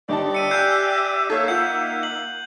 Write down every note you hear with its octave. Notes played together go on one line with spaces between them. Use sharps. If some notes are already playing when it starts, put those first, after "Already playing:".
G1 D#4 G4 D5 A5
E5 C#7 D#7
G#5 E6 F#6 G6 C7
A#3 D#4 A4 C#5
F4 F#5 G6
F#7